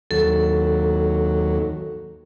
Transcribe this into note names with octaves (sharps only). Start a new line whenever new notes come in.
D#2 F#3 A4